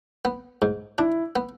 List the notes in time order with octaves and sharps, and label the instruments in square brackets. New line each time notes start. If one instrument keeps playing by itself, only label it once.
[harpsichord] B3
G#2
[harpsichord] D4 [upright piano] E4
[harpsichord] B3